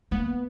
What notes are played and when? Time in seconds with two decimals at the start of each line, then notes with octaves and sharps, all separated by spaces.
0.11 A#3 B3